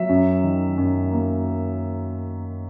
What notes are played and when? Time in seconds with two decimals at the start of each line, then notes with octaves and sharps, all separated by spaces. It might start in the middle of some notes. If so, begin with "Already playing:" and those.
Already playing: F#3 E5
0.09 F#2
0.43 D#3
0.78 F#2
1.11 A#3